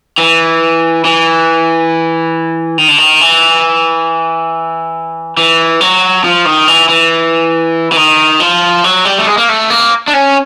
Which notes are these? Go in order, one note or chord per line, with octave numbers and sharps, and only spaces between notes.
E3
E3
D#3
D3
D#3
E3
E3
F#3
F3
D#3
E3
E3
E3
D#3
F3
F#3
G3
A3
G#3
A#3
A3
A#3
D4
C#4